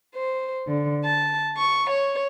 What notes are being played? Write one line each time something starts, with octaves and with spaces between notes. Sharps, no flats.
C5
D3
A5
C#6
C#5